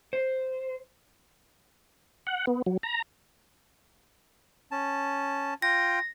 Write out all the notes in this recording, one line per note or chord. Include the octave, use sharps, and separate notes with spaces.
C5
F#5
B3
F#3
A#5
C#4 A5
F4 G5 A#6